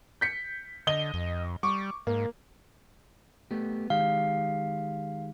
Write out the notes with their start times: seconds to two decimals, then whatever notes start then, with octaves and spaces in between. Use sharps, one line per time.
0.21 G6 B6 C#7
0.87 D3 D#5 G7
1.14 F2
1.63 G3 C#6 D6
2.07 G#2 A#3
3.51 A3 B3 G4
3.90 D#3 G#3 G4 F5